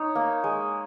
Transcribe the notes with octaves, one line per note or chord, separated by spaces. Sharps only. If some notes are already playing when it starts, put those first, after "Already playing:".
Already playing: D#4 C#5
A#3
G#3